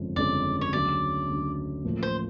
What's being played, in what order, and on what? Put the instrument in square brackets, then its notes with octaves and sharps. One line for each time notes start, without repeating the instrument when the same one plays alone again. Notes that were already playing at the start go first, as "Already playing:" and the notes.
Already playing: [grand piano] G1 F2 C#3 F3 G#3
[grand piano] G1 F2 C#3 F3 G#3 [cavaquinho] D5
[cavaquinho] C#5
[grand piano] D2 C#3 F#3 [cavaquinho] D5
[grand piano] D2 C#3 F#3
A1 A2 F3 A#3
[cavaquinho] C5